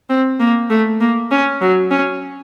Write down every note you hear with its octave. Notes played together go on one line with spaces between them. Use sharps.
C4
A#3
A3
A#3
C#4
F#3
C#4